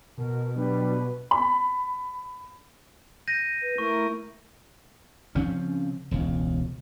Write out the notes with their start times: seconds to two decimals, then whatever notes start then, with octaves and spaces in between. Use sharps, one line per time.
0.18 B2 A#4
0.56 F#3 G3 D4 B4
1.31 B5
3.28 G6 A#6 D#7
3.62 B4
3.78 A3 E4 A#4 C#6
5.35 C#3 F3 C4 C#4
6.11 E1 C#2